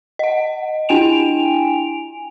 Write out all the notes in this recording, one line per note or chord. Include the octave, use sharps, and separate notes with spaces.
D#5 F#5
D4 E4 G5 G#5 D7 F7